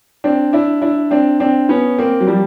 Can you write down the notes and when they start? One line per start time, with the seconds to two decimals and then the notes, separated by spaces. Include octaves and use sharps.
0.24 C4 D4
0.53 D4 E4
0.82 D4 E4
1.11 C4 D4
1.40 C4 D4
1.69 B3 C#4
1.98 A#3 C4
2.20 F#3
2.27 F3 G3